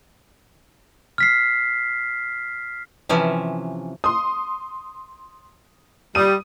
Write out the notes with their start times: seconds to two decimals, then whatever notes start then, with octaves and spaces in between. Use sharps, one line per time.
1.18 F6 B6 C7
3.09 C3 E3 F3 C#4
4.04 C6 D#6
6.15 G3 D#6 D#7